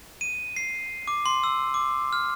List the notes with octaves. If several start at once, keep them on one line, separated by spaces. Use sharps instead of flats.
D#7
C7
D6
C6
E6
D6
F6